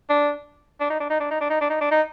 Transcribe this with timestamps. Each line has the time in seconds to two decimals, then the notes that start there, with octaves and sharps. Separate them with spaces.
0.09 D4
0.80 D4
0.90 D#4
1.00 D4
1.10 D#4
1.20 D4
1.31 D#4
1.41 D4
1.50 D#4
1.61 D4
1.70 D#4
1.81 D4
1.91 D#4